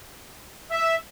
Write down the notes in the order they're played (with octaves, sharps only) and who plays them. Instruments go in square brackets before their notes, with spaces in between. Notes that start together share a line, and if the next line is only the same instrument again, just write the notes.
[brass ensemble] E5